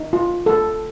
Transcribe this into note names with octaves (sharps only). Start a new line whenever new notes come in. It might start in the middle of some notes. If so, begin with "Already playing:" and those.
Already playing: D#4
F4
A4